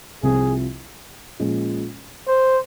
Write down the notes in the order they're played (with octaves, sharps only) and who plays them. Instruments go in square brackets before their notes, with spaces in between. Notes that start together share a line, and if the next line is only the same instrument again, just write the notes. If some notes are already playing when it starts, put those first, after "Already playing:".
[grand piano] C2 C3 F3 C4 F4 [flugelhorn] G#4
[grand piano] A#2 F3 G#3 C#4
[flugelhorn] C5